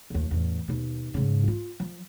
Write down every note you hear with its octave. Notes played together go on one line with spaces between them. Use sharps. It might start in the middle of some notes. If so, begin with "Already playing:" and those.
D#2 A#2
A1 E2
D#2 B2
G#2 C#3
F4
F3